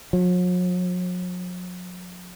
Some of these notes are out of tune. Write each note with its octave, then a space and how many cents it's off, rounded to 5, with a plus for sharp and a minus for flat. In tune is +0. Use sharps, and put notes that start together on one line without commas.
F#3 -45